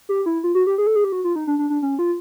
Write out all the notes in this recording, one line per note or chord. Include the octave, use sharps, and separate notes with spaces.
G4
E4
F4
F#4
G4
G#4
A4
G#4
G4
F#4
F4
D#4
D4
D4
D4
C#4
F4